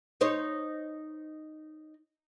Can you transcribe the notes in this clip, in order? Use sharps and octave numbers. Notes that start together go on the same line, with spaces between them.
D#4 C5 C#5